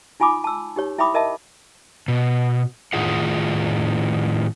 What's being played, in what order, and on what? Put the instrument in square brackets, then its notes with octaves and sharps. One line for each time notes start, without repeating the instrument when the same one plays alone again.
[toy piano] D#4 F4 G#5 B5 D6 D#6
A5 E6
D#4 G4 C#5
E4 E5 G5 B5 D6 D#6
A#4 D#5 E5 A5
[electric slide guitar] B2
A2 D#3 F4 G#4 F#5